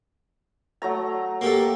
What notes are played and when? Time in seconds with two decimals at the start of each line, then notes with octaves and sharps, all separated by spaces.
0.82 F#3 A3 A#5
1.41 A#3 G4 A4